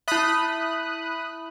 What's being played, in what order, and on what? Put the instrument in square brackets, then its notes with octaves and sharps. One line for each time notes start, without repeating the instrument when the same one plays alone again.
[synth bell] E4 E5 [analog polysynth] B5 D#6 F#6